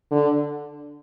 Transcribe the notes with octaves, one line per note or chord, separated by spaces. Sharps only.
D3